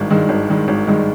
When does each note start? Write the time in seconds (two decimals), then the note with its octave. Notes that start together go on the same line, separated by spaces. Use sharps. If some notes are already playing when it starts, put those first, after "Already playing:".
Already playing: G#1 G2 D#3 G#3
0.10 G2 D#3 G#3
0.29 G#1
0.49 G2 D#3 G#3
0.68 G#1
0.87 G2 D#3 G#3